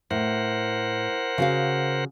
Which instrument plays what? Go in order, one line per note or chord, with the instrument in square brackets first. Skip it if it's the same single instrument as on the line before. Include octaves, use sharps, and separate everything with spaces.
[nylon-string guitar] A2 [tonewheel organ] A#4 C5 F#5
[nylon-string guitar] C#3 F#4 F5